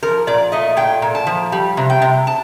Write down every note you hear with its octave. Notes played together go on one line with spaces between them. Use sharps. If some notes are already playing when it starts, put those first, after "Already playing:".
F3 A#4
A#2 D5
A3 D#5
A#2 G5
A#2
A5
F3
G3
C3
G5
C3
A5